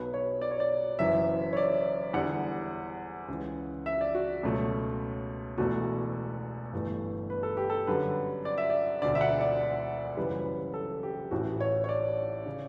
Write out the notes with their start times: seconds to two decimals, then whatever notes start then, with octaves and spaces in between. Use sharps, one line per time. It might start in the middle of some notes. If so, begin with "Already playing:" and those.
Already playing: B1 B2 F#3 B4
0.14 C#5
0.41 D5
0.51 C#5
0.60 D5
0.99 F#1 F#2 E3 E5
1.53 C#5
1.57 D5
2.13 E2 D3 G3 F#5
3.28 C#2 C#3 E3
3.86 E5
4.01 D5
4.15 F#4
4.43 C#2 B2 F#3 A3
5.58 E1 E2 B2 A3 F#4
6.73 G1 G2 E3 A3
7.30 B4
7.43 A4
7.57 G4
7.70 A4
7.87 F#2 D3 G3 B4
8.45 D5
8.58 E5
8.70 D5
9.02 E1 D2 D3 D5
9.15 E5
9.21 F#5
9.41 D5
10.17 F#1 F#2 C#3 E3 G3 B4
10.74 A4
11.03 G4
11.31 A1 A2 E3 F#4
11.60 C#5
11.84 C#5
11.89 D5
12.46 C#3